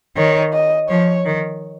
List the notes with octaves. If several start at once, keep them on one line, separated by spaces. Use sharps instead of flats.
D#3 C#5
D#5
F3 C#5
D#3